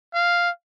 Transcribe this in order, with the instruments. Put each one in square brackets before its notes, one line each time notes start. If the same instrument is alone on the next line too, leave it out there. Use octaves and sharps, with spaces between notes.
[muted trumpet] F5